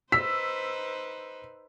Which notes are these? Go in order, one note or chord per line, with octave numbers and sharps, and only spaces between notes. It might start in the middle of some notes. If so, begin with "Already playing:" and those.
D#4 B4 C5 E6 B6